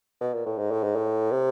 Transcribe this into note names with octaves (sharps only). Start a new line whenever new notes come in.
B2
A#2
A2
G#2
A2
G#2
A2
C3